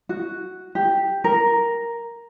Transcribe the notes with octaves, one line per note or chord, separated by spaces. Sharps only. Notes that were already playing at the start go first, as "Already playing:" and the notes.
F#4
G4
A#4